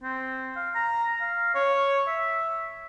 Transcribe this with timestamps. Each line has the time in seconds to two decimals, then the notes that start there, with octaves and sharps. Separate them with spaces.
0.03 C4
0.56 F5
0.75 A#5
1.21 F5
1.55 C#5
2.08 E5